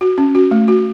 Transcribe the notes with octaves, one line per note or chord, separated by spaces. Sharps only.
F#4
C#4
F#4
A3
F#4